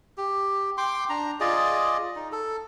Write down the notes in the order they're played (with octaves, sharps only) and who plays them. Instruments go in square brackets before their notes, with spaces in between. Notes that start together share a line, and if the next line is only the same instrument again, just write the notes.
[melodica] G4
G5 C6 D6
D4 A#5
F4 G#4 D5 D#5
D#4
A4